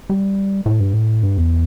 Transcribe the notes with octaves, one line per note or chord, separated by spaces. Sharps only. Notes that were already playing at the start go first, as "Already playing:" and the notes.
G3
A2
G2
A2
G2
E2